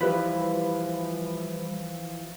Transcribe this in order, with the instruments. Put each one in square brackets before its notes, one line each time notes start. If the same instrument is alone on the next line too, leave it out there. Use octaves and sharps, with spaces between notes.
[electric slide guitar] E3 F3 [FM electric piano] G3 B4 B5